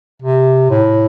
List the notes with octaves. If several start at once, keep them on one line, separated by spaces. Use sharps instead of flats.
C3
A2